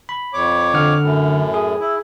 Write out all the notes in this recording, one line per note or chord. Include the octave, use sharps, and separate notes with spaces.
B5
F2 C#5 D6
D3 F#5 F6
F#2 A2
G#4
E4